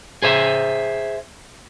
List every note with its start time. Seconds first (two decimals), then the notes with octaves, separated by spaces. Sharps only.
0.22 G#4 C5 E5